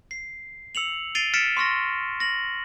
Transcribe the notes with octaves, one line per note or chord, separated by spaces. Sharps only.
C7
E6 C#7 F7 F#7
A6 C7 D7 D#7 F7 G7
F6 A6 B6 C#7 D7 E7
C6 C#6 F6 A#6
A#6 F#7